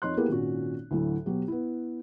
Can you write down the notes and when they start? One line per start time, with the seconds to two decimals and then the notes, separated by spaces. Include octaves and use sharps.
0.02 F2 D#4 C#5 C6 F#6
0.17 A#3 B3 E4 G4 G#4 A#4
0.29 G#1 A#2 C#4 F#4
0.91 D2 A2 F#3
1.26 B2 F#3 G4
1.48 B3 E4